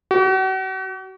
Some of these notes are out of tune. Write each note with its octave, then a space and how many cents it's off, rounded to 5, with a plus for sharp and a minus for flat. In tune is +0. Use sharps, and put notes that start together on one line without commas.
F#4 +40